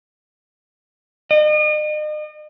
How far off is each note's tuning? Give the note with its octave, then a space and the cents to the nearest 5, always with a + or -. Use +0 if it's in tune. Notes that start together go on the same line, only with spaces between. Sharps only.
D#5 -40